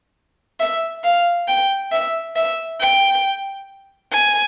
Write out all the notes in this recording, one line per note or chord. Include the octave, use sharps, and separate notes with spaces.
E5
F5
G5
E5
E5
G5
G#5